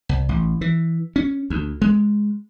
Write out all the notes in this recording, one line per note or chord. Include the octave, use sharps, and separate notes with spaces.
C2
A1
E3
C#4
D2
G#3